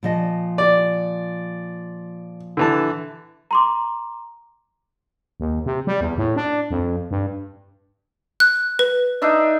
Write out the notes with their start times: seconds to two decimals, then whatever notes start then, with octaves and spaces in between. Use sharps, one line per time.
0.03 A#2 F3 D#5
0.58 D5
2.57 D3 E3 A5
3.51 A#5 C6 D6
5.40 D#2
5.66 C3
5.87 G3
6.01 E2
6.18 A2
6.36 D4
6.71 F2
7.11 G2
8.40 F#6
8.79 B4
9.22 D4 D#4 E5